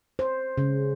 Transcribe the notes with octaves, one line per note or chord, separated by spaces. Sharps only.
C5
C#3